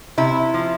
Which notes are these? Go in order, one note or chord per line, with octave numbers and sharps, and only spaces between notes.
C3 E4
F3